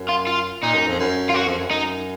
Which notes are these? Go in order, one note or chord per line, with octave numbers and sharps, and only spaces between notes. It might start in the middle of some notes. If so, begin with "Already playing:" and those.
Already playing: F#2
F4
F4
A#2 D#4
F#2
F2
F#2
F4
F#2 F#4
F2
F#2
F#2 D#4